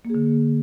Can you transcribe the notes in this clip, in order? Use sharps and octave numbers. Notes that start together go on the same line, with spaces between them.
D3 A#3 G#4